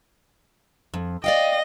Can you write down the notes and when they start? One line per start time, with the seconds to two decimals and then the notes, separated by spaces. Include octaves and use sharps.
0.94 F2
1.24 D5 D#5 F5 G5